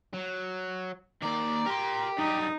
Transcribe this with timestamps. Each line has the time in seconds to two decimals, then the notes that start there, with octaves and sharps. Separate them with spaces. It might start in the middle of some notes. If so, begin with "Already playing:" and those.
0.14 F#3
1.22 D#3 A#3 D5 A#5
1.66 G4 A#4 C6
2.18 F#2 G3 D#4 D#6